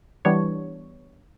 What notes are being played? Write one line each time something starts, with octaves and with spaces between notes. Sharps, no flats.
E3 G3 B3 D4 C#5